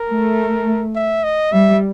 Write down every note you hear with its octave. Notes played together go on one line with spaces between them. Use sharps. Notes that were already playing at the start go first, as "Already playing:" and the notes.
Already playing: A#4
A3
E5
D#5
G3 E5